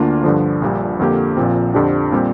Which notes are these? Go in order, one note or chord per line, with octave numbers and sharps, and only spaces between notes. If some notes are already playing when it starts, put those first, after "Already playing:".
Already playing: D2 D3 A#3 D4 F4
G2 D3 F3
A#1 A#2 G3
F2 D3 A#3 G4
A#1 A#2 F3 C4
F2 D3 F3 D4 G4
A#2 G3 C4 G4